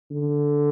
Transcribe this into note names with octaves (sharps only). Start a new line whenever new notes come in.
D3